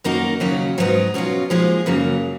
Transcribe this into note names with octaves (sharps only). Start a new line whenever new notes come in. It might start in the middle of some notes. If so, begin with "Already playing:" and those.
F#2 D#3 A#3 D#4 F#4
D#2 C#3 F#3 C#4 F#4
G#2 F#3 B3 D#4
B2 F#3 C#4 F4
A#2 F3 G#3 D#4 G#4
F#2 C#3 F#3 A#3